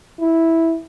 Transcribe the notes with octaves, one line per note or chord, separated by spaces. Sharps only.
E4